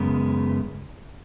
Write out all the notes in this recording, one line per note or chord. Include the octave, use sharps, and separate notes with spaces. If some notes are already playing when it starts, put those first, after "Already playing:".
Already playing: F#2 C#3 G#3 B3